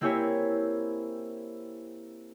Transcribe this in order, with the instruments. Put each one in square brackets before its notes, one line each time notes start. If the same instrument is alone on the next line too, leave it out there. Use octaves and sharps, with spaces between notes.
[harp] A#3 C4 E4 G4 C#5 G#5